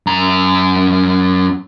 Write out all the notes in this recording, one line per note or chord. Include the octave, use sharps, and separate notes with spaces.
F#2 A#5